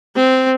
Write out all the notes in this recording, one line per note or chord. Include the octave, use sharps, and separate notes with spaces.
C4